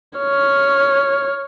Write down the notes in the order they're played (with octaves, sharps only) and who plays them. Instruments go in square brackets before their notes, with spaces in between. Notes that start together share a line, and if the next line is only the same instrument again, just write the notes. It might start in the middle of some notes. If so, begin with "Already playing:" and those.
[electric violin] C#5 F6